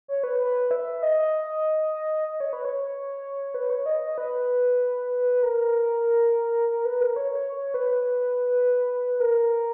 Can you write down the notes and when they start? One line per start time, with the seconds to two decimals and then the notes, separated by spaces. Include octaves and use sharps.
0.08 C#5
0.24 B4
0.39 B4
0.71 E5
1.02 D#5
2.28 D#5
2.40 C#5
2.53 B4
2.65 C#5
3.54 B4
3.70 C#5
3.86 D#5
4.01 D#5
4.18 B4
5.43 A#4
6.69 A#4
6.85 B4
7.01 A#4
7.16 C#5
7.32 C#5
7.53 C#5
7.74 B4
9.20 A#4